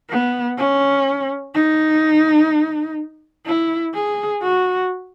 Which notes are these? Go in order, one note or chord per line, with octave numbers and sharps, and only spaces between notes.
B3
C#4
D#4
E4
G#4
F#4